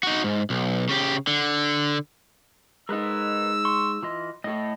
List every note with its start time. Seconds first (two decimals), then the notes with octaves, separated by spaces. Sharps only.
0.03 D#4 F#4
0.24 G#2
0.50 B1
0.89 C#3 G4
1.27 D3
2.89 G#3 D#4 A#4 B4 D#5 E6
3.65 C6 C#6
4.03 E3 F4 D#5
4.44 A2 A3 A4 D#5